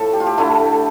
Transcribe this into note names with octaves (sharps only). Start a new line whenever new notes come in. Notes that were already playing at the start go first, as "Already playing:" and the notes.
Already playing: A2 F3 A3 A4
G4
F4
G4
D3 F3 A3 E4